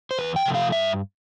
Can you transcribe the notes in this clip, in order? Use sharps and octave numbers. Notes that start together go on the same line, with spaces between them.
C5
E2 B4
G5
C3 F3 A3
F5
G2 E5